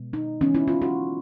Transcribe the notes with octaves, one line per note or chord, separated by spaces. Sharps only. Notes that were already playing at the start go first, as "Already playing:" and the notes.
Already playing: B2 G#3 B3
D#4
E3 G#3 B3 C#4
E4
F4
F#4